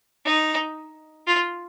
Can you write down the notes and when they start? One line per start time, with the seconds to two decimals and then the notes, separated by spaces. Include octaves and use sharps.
0.25 D#4
1.27 F4